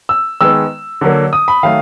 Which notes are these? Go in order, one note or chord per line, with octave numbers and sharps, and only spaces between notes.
E6
D#3 G#3 B3 E6
D3 F#3 A#3
D#6
B5
D#3 F#3 A3 F5